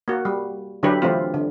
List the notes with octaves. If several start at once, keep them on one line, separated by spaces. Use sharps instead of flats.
A#3 F#4
G3
D3 F#3 D4 E4 G4 B4
E3 F#3 A3 C4 F4
D3